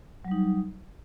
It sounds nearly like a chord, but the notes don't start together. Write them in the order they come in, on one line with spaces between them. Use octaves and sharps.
F#3 G3 D#4